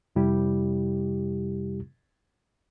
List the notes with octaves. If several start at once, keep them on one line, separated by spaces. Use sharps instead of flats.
F2 C3 G3 E4 G4